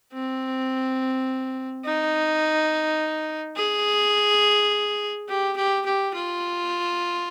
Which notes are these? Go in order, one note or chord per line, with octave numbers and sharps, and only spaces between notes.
C4
D#4
G#4
G4
G4
G4
F4